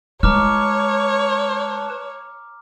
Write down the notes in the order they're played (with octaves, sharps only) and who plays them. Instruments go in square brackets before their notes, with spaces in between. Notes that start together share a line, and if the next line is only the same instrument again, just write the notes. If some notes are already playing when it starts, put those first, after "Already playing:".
[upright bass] G#3 E4 [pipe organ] B4 A5 [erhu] C#5 [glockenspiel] A#5 D6 F6